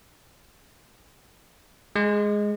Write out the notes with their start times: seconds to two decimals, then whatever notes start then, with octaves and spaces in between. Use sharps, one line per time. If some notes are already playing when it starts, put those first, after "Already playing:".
1.96 G#3